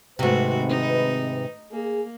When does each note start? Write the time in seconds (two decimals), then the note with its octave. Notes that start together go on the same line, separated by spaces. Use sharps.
0.19 G#1 G#2 C3 A3 C4 F#4 B4
0.69 D#4
1.71 A#3 G#4